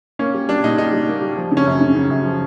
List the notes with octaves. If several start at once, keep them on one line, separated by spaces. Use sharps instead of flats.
A#3 C#4
G3
G3 D4
A#2 D#4
G3 D#4
G3
A#3
G3
F3
C#3
C#4
F#2
C#3
C#3
F#2
F3